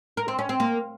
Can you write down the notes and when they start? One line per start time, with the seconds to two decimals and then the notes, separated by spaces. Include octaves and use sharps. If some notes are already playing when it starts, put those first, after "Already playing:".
0.17 A#4
0.28 C4
0.39 C#4
0.49 C4
0.60 A#3